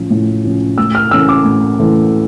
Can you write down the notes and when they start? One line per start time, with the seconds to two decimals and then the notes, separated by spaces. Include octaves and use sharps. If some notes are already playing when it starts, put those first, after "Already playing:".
Already playing: A2 F3 C#4
0.10 A2
0.44 F3 C#4
0.78 A2 E6
0.95 F6
1.11 E3 A3 C#4 E6
1.29 D6
1.45 A2
1.79 E3 A3 C#4